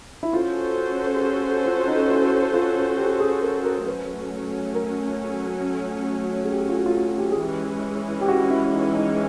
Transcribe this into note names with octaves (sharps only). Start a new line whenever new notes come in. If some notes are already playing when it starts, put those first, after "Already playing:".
E4
C#4 F4 F#4 A4 C5
G#4
G4
F4
D#4
E4
F4
G4
G#4
A#4
A#4
F#3 A3 C#4 B4
A#4
G#4
G4
F4
F#4
F4
F#4
G4
G#4
E3 G#3 C#4 G4
G4
F#4
E4
D#4
D#4